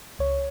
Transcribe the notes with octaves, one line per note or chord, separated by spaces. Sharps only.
C#2 C#5